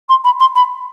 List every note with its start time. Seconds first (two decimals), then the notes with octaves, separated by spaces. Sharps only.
0.08 C6
0.24 B5
0.39 C6
0.55 B5